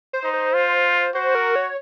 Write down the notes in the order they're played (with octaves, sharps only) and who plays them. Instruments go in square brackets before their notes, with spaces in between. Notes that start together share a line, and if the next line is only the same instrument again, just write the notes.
[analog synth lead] C5
[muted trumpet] D#4
[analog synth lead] C5
[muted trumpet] F4
[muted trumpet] F#4 [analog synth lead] C5
[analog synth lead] A#4
C#5